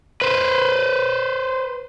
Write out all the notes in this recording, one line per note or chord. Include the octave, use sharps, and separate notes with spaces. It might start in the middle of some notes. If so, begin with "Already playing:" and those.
B4 C5